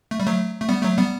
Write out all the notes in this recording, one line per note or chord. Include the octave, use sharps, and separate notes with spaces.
A3
G3
F#3 A3
A3
G3 B3
F#3 A3
G3 B3